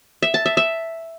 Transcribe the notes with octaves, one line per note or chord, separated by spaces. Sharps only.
E5
A5
E5
E5